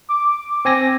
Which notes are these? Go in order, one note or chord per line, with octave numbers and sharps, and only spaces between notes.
D6
C4 G#5 A#6